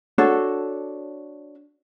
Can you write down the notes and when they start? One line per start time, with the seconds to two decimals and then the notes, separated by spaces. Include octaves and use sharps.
0.18 D4 F#4 A4 C#5